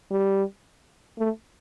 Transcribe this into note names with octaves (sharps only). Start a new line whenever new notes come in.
G3
A3